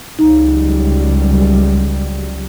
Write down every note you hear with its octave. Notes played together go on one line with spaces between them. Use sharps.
C#2 F#3 G3 D#4